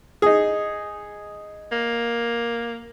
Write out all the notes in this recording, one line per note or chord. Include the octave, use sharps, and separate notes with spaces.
D#4 G#4
A#3